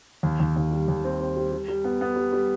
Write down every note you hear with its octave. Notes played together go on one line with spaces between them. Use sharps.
D#2
D#2
D#2
G3
D#2
C4
C4
G3
G3
G3
B3
B3
G3
G3